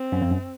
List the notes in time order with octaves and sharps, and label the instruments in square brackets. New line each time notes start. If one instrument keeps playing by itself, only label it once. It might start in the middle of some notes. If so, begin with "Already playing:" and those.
Already playing: [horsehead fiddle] C4
[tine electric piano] F#2
F2
F#2